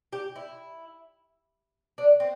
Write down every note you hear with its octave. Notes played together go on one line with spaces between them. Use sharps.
G4
E4
D4
C4